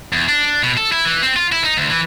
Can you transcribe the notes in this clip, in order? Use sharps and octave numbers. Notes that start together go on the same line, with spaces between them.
E2
D4
B2
A4
E4
E3
C4
F4
E4
D#4
D2
E3